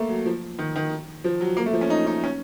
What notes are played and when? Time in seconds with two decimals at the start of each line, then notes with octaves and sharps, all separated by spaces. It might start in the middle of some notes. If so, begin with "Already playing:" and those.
Already playing: A3 A#3
0.09 F#3
0.26 F3
0.59 D#3
0.76 D#3
1.24 F3
1.41 F#3
1.57 A#3
1.66 A3
1.73 F3
1.81 C#4
1.90 D#4
2.07 D#4
2.24 C#4